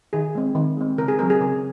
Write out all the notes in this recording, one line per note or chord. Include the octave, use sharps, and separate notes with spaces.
D#3 G#4
G#3 C4
D#3
G#3 C4
C#3 A#4
G#4
F#3 C4 A#4
G#4
C#3